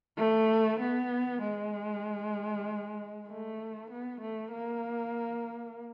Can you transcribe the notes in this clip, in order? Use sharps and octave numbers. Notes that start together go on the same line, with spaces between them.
A3
B3
G#3
A3
B3
A3
A#3